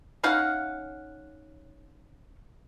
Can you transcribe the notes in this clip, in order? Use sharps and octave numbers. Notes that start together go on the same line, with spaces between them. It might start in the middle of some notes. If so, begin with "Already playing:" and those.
C#4 D#4 F5 F#5